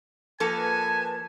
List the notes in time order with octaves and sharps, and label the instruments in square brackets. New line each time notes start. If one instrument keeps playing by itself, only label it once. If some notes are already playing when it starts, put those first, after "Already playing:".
[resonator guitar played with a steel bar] F3 A#3 A4 [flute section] B4 A5 [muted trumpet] G#5